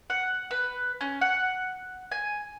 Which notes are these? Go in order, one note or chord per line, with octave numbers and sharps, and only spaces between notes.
F#5
B4
C#4
F#5
G#5